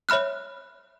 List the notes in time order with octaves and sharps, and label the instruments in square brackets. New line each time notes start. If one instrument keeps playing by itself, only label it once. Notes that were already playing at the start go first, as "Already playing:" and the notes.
[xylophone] C#5 E5 B5 F6 F#6